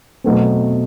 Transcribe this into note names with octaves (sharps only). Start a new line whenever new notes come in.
B2 F#3 A3 C4